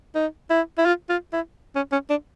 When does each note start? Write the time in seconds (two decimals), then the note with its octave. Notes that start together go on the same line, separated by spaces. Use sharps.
0.15 D#4
0.50 E4
0.78 E4
0.85 F4
1.09 F4
1.33 E4
1.75 C#4
1.92 C#4
2.10 D4